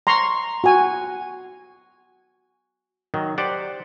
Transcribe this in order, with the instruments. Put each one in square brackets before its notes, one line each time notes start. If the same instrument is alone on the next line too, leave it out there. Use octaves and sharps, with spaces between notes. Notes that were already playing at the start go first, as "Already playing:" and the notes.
[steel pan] A#5 C6 C#6
F#4 G#5
[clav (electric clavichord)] D#3 F#3
G4 C5 D5 F#5